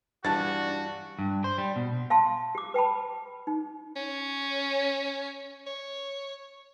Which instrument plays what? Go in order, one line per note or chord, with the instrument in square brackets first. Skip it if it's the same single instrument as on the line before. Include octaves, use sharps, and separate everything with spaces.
[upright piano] G2 E3 G3 [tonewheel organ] D4 [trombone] F#4 [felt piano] A5 A6
[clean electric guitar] G2
C5
G3
B2
[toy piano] F5 A5 C6
G4 D6
B4 G5 A5 B5
D#4
[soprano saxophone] C#4
C#5